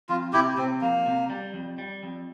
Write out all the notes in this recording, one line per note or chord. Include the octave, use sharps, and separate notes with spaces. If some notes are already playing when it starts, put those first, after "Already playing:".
F2 F4
C3 E4 G4
C3 C4
F2 A#3
C3
G3
F2
G3
F2